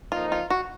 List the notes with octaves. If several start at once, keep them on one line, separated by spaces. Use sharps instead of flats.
F2 F3 A#3 D#4 F4
F4
F#4